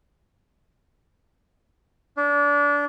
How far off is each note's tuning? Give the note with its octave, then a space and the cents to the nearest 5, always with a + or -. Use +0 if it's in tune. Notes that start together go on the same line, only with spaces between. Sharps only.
D4 -25